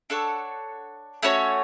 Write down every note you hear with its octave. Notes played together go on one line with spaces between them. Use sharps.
D4 A4 C#5 F#5
A3 C#4 F#4 C#5